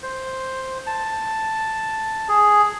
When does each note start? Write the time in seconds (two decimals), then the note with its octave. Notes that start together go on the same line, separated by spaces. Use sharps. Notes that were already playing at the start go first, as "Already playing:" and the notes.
0.03 C5
0.87 A5
2.28 G#4